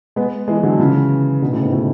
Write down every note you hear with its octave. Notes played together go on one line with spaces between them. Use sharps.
G#3 B3
E3 G#3
D3 F#3
C#3 E3
B2 D3
A2 C#3
G#2 B2
A2